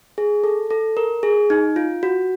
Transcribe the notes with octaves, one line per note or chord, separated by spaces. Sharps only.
G#4
A4
A4
A#4
G#4
D#4
F4
F#4